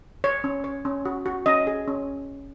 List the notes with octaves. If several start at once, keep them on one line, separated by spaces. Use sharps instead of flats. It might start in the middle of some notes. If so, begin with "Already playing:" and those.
C#5
C#4
C#5
C#4
F#4
F#4
C#4 D#5
G#4
C#4